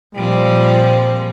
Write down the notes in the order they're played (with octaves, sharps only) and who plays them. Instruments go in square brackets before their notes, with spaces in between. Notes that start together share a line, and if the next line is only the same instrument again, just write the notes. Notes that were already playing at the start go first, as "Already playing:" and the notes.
[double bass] A#2 [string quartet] F3 G#3 C4 [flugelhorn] G3